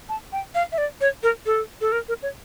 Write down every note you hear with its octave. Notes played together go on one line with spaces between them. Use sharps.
A5
G5
F5
E5
D5
C#5
A#4
A4
A4
A#4
A#4
C#5